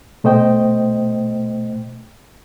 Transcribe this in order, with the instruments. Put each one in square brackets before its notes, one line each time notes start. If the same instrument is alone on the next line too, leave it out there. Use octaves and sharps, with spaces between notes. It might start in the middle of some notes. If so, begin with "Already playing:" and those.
[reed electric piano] B2 A3 C5 D#5 G5